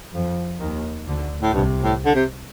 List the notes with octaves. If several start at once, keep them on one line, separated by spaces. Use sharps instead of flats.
F2 F3
D#2 D#3
D2 D3
A2
C2 G2 C3
A2
D3
C3